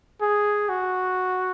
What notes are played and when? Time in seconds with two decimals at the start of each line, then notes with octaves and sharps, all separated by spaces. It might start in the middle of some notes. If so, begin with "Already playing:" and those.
0.21 G#4
0.69 F#4